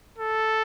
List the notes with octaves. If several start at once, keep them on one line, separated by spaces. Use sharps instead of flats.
A4